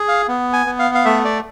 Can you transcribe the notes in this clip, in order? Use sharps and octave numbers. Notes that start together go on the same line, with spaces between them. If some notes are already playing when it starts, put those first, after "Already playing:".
Already playing: G#4
F5
B3
G#5
B3
F5
F5
A3 E5
D5